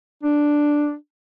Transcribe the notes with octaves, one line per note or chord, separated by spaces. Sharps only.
D4